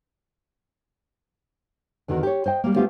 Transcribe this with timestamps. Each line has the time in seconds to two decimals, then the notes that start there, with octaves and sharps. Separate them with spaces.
2.08 E2 D3 D#3 F#4 A#4
2.23 G4 C#5
2.46 C5 D#5 G5
2.64 G3 A#3
2.75 A3 B3 C#4 F4 G4 C5